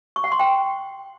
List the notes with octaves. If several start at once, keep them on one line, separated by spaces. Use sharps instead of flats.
C#6
F#5
C6
G5